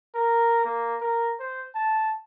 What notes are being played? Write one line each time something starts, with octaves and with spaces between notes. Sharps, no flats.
A#4
A#3
A#4
C5
A5